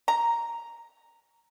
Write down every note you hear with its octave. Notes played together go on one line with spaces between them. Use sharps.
A#5